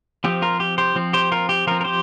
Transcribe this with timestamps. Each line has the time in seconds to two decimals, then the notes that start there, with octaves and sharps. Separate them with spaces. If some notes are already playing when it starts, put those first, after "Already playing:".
0.24 F3 C4 G4
0.42 F4 A#4
0.60 G4
0.78 G4 C5
0.95 F3 C4
1.13 G4 C5
1.32 F4 A#4
1.49 G4
1.67 F3 C4 F4 A#4
1.81 A#4
1.84 G4 C5